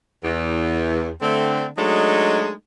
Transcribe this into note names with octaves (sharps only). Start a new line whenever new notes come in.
E2
D3 A3 C4
F#3 G#3 A3 D4 D#4 D#5